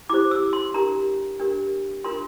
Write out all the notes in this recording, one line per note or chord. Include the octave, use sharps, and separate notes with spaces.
E4 G4 C5 D6
E6
C6
D4 G4 A#4 A#5
D4 G4 A#4
D4 F4 A#4 C6